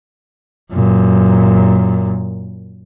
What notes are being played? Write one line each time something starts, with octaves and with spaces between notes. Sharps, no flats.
F#2 A#2